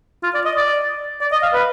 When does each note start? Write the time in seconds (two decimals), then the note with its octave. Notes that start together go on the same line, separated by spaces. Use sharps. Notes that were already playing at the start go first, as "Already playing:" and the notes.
0.23 F4
0.35 D5
0.46 D#5
0.56 D5
1.21 D5
1.32 D#5
1.43 F5
1.53 B4